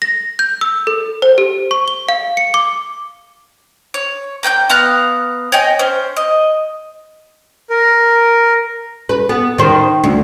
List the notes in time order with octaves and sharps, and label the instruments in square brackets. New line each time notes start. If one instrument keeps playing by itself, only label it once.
[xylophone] A#6
G6
E6
A4
C5
G4
C#6
G7
F5
C#7
D6
[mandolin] C#5
A#3 G5 G#5 G6
B3 F5 A#5 F#6
C#5 D#5 G5 G#5
C#4 C5
D#5
[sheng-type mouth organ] A#4
[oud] B4
B3
D#3 C5
D2